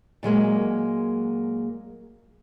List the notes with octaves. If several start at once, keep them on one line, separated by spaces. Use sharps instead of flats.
A#2 F#3 G#3 A#3